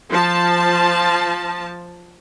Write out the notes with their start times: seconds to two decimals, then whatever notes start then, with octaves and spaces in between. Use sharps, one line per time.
0.10 F3 A5